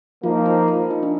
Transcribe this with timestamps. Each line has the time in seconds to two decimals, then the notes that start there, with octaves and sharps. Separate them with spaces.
0.22 F3 A#3 D#4 F4
0.46 F4
0.68 F4
0.91 D#4
1.03 D4